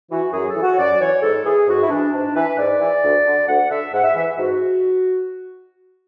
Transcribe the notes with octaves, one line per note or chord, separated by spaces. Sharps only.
E3 F#4
F#2 G#4
A4
E3
F#4
C#5
F#2 D5
E3 C#5
G#2 A4
E3 G#4
G#2 F#4
E4
E3 D4
G#2 D4
E3 B4
G#2 D5
E3
D2
D3
D2 F#5
D3 E5
G#2 F#5
E5
E3 E5
G#2 F#4